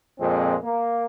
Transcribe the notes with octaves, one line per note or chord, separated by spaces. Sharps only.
F2 A#2 G#3 C4
A#3